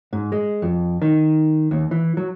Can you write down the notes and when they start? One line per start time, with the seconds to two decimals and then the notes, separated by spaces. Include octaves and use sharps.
0.13 G#2
0.32 G#3
0.62 F2
1.02 D#3
1.71 D#2
1.91 E3
2.17 F#3